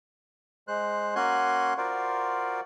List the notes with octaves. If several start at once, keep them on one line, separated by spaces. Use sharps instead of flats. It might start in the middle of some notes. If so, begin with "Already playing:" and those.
G#3 C5 F#6
A#3 C#4 F#4 G#5 C6 F#6
F4 F#4 A#4 C5 D5